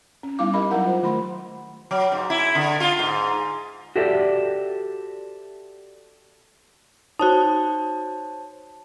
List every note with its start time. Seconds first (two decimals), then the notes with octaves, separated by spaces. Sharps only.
0.23 C#4
0.39 G3 B3 D#4 E4 F5 D6
0.54 D4 G4 A#4 D#5 B5
0.71 F#3 E4 A#4 F#5 A#5
0.84 F4 C5
1.02 D#3 A3 B5 C6
1.91 F#3
2.12 G#2
2.30 E4
2.55 D3
2.80 F4
2.99 G#2
3.96 F#4 G4 A4 C5 D5 E5
7.19 D#4 F#4 C5 C#5 A5